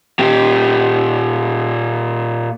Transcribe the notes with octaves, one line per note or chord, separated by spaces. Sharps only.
A#2 G4